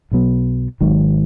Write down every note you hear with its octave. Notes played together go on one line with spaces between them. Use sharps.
B1 B2 F#3 B3
G#1 G#2 D#3 F#3